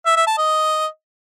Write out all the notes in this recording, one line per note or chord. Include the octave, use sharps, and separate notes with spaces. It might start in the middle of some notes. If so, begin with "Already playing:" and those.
E5
E5
A5
D#5